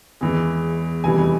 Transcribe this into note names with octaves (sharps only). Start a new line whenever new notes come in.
E2 E3 G#3
F1 E2 E3 G3 G#5